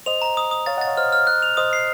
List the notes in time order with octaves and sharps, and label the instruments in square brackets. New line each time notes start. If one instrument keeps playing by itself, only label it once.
[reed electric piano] C5 D#5 [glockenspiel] F7
[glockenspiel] A#5
D#6
D#6
[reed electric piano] C#5 F5 [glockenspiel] A6
[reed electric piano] D#5 F#5 [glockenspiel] A6
[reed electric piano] C#5 F5
[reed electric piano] C5 D#5 [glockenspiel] F6
[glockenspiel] F6
F#6
F7
[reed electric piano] C5 D#5 [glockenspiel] D#6
[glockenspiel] C7